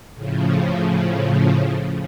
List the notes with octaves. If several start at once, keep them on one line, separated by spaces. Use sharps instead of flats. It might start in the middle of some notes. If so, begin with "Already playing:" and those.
A2 C#3 F3